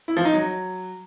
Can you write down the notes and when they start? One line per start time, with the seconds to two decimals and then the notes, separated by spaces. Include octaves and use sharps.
0.08 E4
0.17 F3
0.25 D#4
0.34 F#3